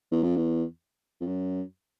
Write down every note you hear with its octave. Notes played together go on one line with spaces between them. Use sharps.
E2
F2
E2
F2
F#2